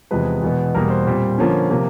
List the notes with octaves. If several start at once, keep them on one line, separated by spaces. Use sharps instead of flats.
E2 C3 F3 G#3 B4
E2 B2 G#3 B3
E2 B2 G3 A#3 A#4
C5
A#2 G3 C4
D3 F3 A#3 C#4
C3 F3 A#3